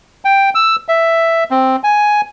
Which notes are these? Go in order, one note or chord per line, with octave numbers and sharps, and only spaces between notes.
G5
E6
E5
C4
G#5